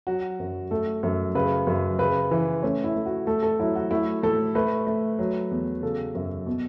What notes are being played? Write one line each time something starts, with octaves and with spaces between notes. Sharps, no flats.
F#3 F#4
F#2
A3 A4
F#2
C#3 B4
F#2
C#3 B4
E3
A3 C#4
E4
A3
F#4
A3 A4
A4
F#3 E4
F#4
A3 E4
A2 A4
A3 B4
A3
F#3
E2
C#3 A4
F#2
B2